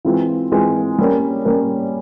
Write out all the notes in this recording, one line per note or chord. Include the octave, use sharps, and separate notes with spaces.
E3 G#3 C4 F4
E3 G#3 C4 F4
G3 A#3 C#4
G3 A#3 C#4